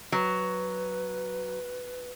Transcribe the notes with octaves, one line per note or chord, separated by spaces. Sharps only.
F#3 B4